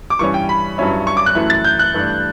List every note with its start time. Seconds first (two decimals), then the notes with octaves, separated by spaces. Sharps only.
0.10 D6
0.19 G2 E3 G3 C#4 C#6
0.34 G5
0.49 B5
0.78 G2 F#3 C#4 E4
1.07 C#6
1.17 D6
1.26 F#6
1.35 F#2 E3 A3 E4
1.50 A6
1.64 G6
1.79 F#6
1.94 G2 E3 A3 D4